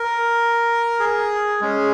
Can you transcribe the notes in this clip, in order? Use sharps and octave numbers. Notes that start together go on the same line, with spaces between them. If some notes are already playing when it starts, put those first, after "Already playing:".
Already playing: A#4
G#4
G#3 C#4 G#4